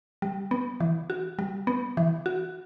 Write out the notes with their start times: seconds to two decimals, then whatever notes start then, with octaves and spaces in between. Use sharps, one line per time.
0.22 G3
0.51 B3
0.80 E3
1.10 F#4
1.39 G3
1.67 B3
1.97 E3
2.26 F#4